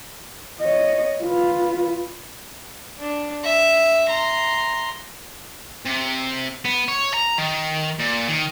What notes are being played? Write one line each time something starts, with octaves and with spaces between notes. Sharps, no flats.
C#5 D#5
F4 B4
D4
E5
A#5 C6
C3
B3
C#5
A#5
D#3
A#2
D#3